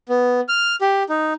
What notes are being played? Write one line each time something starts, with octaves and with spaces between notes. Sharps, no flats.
B3
F6
G4
D#4